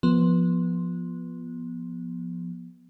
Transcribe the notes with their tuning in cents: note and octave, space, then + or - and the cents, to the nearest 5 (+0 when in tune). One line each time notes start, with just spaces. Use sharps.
F3 +0 B3 -20